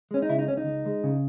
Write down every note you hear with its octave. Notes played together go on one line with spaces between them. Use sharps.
G#3 C#4
D#4
C#3 E4
D#4
C#2 C#4
D#4
C#2
G#3
C#3